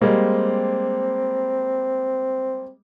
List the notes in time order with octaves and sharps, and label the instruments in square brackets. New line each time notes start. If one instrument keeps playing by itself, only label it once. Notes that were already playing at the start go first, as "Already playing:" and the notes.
[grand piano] G3 G#3 A#3 [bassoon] C4